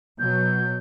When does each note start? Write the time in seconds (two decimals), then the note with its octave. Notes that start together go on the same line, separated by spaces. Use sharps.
0.19 B2 F#3 G6